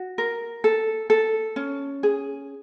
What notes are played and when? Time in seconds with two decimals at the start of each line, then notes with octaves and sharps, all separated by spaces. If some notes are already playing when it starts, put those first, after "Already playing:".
Already playing: F#4
0.18 A#4
0.64 A4
1.10 A4
1.56 C#4
2.03 G#4